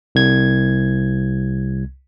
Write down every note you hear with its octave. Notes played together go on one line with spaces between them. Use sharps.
C2 G#6